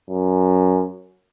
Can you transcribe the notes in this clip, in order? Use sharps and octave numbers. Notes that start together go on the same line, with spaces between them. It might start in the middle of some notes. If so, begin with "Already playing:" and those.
F#2